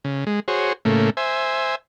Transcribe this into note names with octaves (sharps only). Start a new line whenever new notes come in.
C#3
G#3
F#4 G#4 C5 C#5
A2 C#3 A3 A#3
C5 E5 G#5